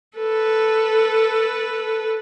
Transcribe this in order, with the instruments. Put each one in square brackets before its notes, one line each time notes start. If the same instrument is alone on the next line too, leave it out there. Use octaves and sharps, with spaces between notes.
[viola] A4 B4